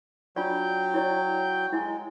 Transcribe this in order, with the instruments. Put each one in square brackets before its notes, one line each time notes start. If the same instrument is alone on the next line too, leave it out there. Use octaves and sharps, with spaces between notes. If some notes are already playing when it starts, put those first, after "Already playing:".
[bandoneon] F#3 G5 [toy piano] D4 F4 D5
[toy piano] E4 C#5 D5
[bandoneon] G#3 [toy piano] E4 D#5